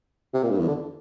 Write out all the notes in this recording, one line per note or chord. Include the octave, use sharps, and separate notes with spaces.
C3
A#2
G2
E2
D3